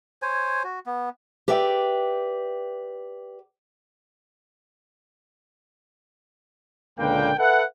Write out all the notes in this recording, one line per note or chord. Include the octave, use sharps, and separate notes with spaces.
C5 C#5 G#5
F#4
B3
G4 B4 D5 E5 G5
C#2 A#2 D3 A#3 B4 G5
A4 B4 E5 F#5